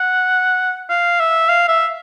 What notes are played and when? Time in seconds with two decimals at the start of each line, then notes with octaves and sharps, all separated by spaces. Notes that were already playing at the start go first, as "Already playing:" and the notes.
Already playing: F#5
0.89 F5
1.19 E5
1.48 F5
1.68 E5